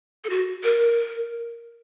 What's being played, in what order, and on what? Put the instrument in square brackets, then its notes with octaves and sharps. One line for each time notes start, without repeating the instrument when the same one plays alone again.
[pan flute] A4
F#4
A#4